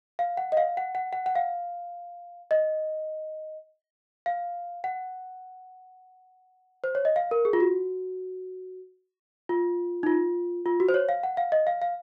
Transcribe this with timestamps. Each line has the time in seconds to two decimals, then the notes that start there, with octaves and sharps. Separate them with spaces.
0.19 F5
0.37 F#5
0.52 D#5
0.57 F5
0.77 F#5
0.95 F#5
1.13 F#5
1.26 F#5
1.35 F5
2.51 D#5
4.26 F5
4.84 F#5
6.84 C5
6.95 C#5
7.05 D#5
7.16 F5
7.31 A#4
7.45 G#4
7.53 F4
7.60 F#4
9.49 F4
10.03 D#4
10.06 F4
10.66 F4
10.80 F#4
10.89 C5
10.94 C#5
11.09 F5
11.23 F#5
11.37 F5
11.52 D#5
11.67 F5
11.82 F5